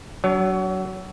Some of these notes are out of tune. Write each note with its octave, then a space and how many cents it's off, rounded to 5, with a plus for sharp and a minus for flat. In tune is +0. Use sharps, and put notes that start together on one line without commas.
F#3 +25 D4 -35 C#5 +20